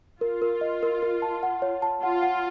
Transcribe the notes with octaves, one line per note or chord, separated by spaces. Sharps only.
F4 A#4
A#4
D#5
A#4
A#4
A5
F#5
C#5
A5
F4 F#5
F#5